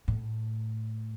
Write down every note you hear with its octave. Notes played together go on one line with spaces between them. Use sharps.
A2